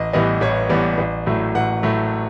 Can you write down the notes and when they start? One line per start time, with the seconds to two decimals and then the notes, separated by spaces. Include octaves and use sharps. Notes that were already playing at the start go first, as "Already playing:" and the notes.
Already playing: A1 D#5
0.13 A2 E3 G3 B3 D#5
0.41 A1 C#5
0.69 A2 E3 G3 B3 D5
0.98 A1
1.26 A2 F#3 A3
1.55 A1 F#5
1.83 A2 F#3 A3